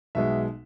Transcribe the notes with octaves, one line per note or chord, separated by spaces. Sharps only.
B1 B2 G#3 E5